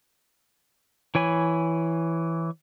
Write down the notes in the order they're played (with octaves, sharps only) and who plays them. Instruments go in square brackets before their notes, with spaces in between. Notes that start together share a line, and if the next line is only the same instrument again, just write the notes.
[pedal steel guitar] E3 C#5 G#5 B5